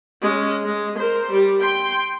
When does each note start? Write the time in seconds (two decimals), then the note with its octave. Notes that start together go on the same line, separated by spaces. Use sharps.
0.22 G#3 C#4
0.65 G#3
0.98 A#4 C5
1.31 G3
1.61 G5 C6